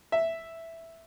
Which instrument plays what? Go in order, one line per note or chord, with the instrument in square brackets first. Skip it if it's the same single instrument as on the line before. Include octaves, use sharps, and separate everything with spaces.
[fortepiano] E5